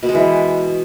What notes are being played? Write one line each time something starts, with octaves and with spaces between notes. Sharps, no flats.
B2
G#3
E3